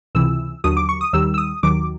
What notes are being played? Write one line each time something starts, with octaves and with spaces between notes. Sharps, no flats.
C#2 C3 E3 E6
D#2 D3 F#3 D#6
D6
C#6
D#6
D#2 D#3 G3 E6
E6
D#6
D#2 D#3 F#3 D6